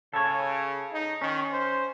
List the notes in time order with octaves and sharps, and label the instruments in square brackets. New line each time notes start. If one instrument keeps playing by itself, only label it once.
[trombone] C#3 [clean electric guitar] A4 C#5
[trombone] D#4
[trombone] D#3 [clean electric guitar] C#4
[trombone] C5